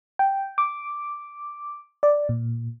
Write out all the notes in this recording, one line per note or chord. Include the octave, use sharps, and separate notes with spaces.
G5
D6
D5
A#2